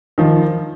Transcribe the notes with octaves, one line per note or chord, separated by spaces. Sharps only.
D#3 F3